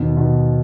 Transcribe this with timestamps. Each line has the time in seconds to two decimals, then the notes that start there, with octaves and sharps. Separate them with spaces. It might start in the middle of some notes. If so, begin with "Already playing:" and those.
Already playing: D#2 B2
0.17 B2